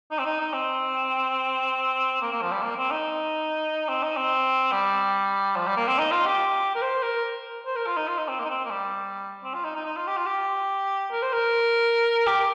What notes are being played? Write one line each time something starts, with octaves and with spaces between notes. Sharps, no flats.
D#4
C4
D#4
D#4
C4
A#3
A#3
F3
G3
A#3
C4
D#4
C4
D#4
C4
G3
F3
G3
A#3
C4
D#4
F4
G4
A#4
C5
A#4
C5
A#4
F4
D#4
F4
D#4
C4
A#3
D#4
C4
A#3
G3
C4
F4
D#4
D#4
D#4
F4
G4
F4
G4
A#4
C5
A#4
G4